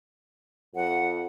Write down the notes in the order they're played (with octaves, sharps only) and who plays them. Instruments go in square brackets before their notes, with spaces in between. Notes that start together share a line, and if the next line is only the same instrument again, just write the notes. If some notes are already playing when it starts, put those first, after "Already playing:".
[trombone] F2 [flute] F#5